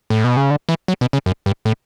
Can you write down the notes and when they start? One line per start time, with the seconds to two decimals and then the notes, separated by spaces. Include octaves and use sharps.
0.10 A2
0.24 B2
0.37 C#3
0.50 D3
0.69 E3
0.88 F#3
1.01 B2
1.13 C#3
1.26 F#2
1.46 G2
1.65 A2